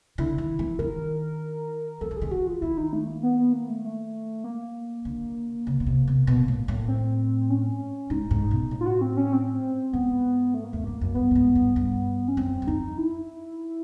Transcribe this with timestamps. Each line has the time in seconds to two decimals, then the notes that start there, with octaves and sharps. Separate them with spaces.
0.18 D3 E4
0.38 D#3
0.59 E3
0.79 D#3 A#4
2.01 F3 A4
2.11 E3
2.16 G#4
2.22 D#3
2.31 E3 F#4
2.47 F4
2.61 D#3 E4
2.77 D#4
2.93 A3
3.07 A#3
3.23 B3
3.38 B3
3.53 A#3
3.69 A3
3.84 A3
4.44 A#3
5.05 D3
5.67 C#3
5.80 B2
5.86 C3
6.08 C3
6.27 B2
6.48 A2
6.68 A2
6.88 C4
7.50 C#4
8.10 G#2 D#4
8.31 G#2
8.51 B2
8.71 A2
8.81 F4
8.86 F#4
9.01 C4
9.17 C#4
9.33 C4
9.93 G#2 B3
10.54 A3
10.64 A#3
10.72 E2 A3
10.84 F2 A#3
11.01 F#2
11.15 G2 B3
11.31 G2
11.35 G#2
11.55 G2
11.76 G2
12.28 C#4
12.37 F#2 C4
12.62 F#2
12.67 F2 D#4
12.98 E4